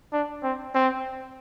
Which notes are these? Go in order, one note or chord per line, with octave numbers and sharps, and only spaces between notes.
D4
C4
C4